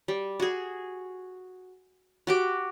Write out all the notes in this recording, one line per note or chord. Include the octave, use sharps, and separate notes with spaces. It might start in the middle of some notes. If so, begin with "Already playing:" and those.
G3
F#4 G#4
F#4 G4 D6